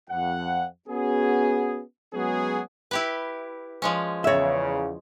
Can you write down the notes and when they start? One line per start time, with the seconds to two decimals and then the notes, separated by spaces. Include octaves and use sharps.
0.10 F2 F#5
0.88 B3 C#4 F#4 G#4
2.14 F#3 G#3 B3 C#4 F#4 G#4
2.91 E4 G4 B4
3.82 F3 G#3 C#4
4.24 E2 C#3 C#5 E5